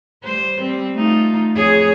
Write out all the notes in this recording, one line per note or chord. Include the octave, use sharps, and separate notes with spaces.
G3 C5
G3 C4
A3 D#4 F4
F2 G#4 C#5